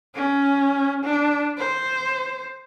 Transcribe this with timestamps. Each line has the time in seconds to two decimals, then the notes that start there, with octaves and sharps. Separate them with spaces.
0.14 C#4
1.04 D4
1.57 C5